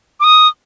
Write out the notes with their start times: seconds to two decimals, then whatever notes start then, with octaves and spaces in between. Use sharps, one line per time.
0.20 D6
0.24 D#6